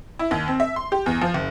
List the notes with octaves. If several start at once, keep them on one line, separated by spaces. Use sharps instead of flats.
E4
D#2
C4
E5
C6
G4
E2
F3
F#1